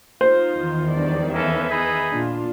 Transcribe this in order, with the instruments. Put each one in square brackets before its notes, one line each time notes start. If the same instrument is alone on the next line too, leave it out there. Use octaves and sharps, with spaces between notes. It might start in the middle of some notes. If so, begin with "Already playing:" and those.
[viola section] D#4 F4 [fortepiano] C5
[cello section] E2 D#3
[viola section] G3 D4 D5
[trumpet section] A#3 C#4 A4 [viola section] B4 E5
[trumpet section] D#4 G#4 B5
[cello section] A#2 [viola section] D4 F4